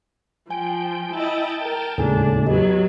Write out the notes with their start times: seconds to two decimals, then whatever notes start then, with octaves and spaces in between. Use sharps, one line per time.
0.50 F3 G5 G#5
1.13 E4 D#5 G5 A5
1.63 A#4
1.98 D#2 A2 C#3 G#3 D4 A4 G#5
2.46 F#3 B3 G4 D#5